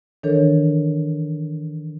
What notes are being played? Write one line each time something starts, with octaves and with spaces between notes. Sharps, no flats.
D#3 E3 D4 A4 A#4 C#5